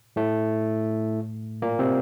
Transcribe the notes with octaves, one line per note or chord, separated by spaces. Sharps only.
A2 A3
A#2 A#3
C3 C4